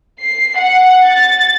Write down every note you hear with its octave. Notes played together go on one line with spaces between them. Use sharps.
C7
F#5
A6